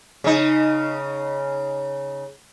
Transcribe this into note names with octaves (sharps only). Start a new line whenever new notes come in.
C#3 D#4